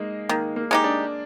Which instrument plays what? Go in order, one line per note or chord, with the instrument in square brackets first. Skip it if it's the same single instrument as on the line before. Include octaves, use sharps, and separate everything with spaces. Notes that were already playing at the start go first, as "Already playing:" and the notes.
Already playing: [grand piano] G#3 A#3 D#4
[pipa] D#3 [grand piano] A#3
[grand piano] A#3
[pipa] G#3 D#4 G4
[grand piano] D4